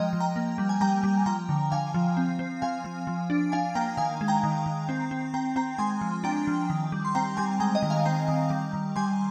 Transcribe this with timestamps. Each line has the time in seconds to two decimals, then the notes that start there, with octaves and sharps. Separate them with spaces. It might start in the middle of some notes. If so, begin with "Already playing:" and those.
Already playing: F3 G#3 D#5 G5 A#5
0.13 F3
0.20 G5 A#5
0.36 A#3
0.58 G3
0.69 G#5
0.81 G3 G5 A#5
1.03 G3
1.26 F3 G5 A#5
1.49 D3
1.72 D3 F5 G#5
1.94 F3
2.17 C4
2.39 C4
2.62 F3 F5 G#5
2.84 F3
3.07 F3
3.30 D4
3.52 D4 F5 G#5
3.75 A#3 G5 A#5
3.97 D#3 F5 G#5
4.21 G#3
4.28 G5 A#5
4.43 D#3
4.66 D#3
4.89 C4
5.11 C4
5.34 C4 G5 A#5
5.56 C4 G5 A#5
5.78 G#3 G#5 C6
6.01 F3
6.24 D4 G5 A#5
6.47 F3
6.70 D#3
6.92 G3
7.05 C6
7.15 C4 G5 A#5
7.37 G3 G#5 C6
7.60 G#3 G5 A#5
7.75 D#5 G5
7.83 D#3
7.90 F5 G#5
8.05 C4 G5 A#5
8.28 D#3
8.50 G3
8.73 D#3
8.96 G3 G#5 C6